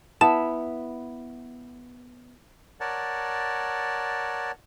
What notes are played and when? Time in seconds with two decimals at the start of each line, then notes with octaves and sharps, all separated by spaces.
0.21 B3 E4 A5 E7
2.80 A#4 C#5 D5 F#5 A5